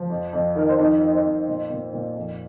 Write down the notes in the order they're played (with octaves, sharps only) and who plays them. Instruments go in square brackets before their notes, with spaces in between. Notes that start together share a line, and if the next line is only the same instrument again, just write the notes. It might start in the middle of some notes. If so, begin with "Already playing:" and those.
Already playing: [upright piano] F3
F2
F2
D#3 A#4
C5
F2 D#4 D#5
F3
C4 C5
F2
A#2
A#2
A#2
F2